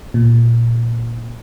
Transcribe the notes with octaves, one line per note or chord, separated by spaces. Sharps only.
A#2